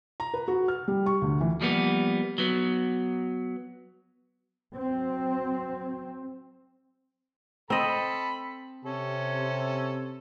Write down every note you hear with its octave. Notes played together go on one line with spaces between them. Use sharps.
A#5
B4
F#4
F6
G3
C#6
D2
E3
F3 G3 A#3 B3
F#3 B3
F#3 C4
C4 A4 D#5 B5
C3 C#4 A4